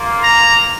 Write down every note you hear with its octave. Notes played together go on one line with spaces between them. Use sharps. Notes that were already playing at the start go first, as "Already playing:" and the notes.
Already playing: A#3 F4
A#5